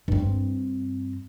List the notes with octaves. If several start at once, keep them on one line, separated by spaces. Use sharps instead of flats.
G2 C4